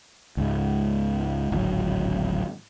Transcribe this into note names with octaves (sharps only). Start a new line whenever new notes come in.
C#2 G#2
D1 G#1 F#3